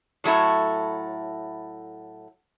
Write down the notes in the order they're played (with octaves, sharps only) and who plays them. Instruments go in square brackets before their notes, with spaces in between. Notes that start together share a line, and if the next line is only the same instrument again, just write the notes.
[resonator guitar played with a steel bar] A2 F#3 A3 E4